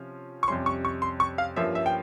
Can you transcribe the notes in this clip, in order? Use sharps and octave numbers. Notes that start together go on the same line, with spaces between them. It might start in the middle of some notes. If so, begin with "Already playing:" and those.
Already playing: C3 F3 C#4
C#6
F2 C3 G3 C#4 C6
C#6
C#6
C6
C#6
F5
G2 F3 A#3 C#4 E5
E5
G5